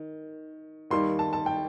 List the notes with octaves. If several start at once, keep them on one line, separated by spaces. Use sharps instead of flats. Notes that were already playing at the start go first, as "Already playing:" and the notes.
Already playing: D#3
D#2 D#3 G3 C6
A5
A5
G5